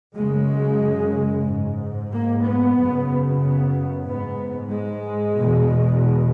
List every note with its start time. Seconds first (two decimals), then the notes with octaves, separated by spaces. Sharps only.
0.16 F#2 C#3 G#3
1.47 G#2
2.12 A#3
2.45 B3
2.77 F#2 C#3
3.41 B3
4.06 G#2 B3
4.71 G#3
5.37 E2 B2